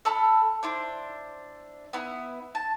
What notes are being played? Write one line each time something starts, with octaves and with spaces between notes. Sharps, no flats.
A4 A5 B5 F6
D4 E4 C5
B3 E4
A5